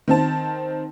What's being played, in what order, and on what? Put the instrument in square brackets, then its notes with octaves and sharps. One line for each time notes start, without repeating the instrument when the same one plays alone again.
[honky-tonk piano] D#3 C4 A5